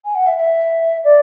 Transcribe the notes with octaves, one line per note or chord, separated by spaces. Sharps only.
G#5
F#5
E5
E5
D5